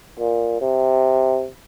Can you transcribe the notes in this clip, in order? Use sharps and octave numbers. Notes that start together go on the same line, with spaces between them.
A#2
C3